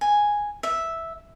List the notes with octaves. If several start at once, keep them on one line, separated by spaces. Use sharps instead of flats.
G#5
E5